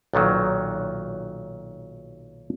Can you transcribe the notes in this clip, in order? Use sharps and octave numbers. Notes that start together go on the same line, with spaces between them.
B1 A#2 D#3 F#3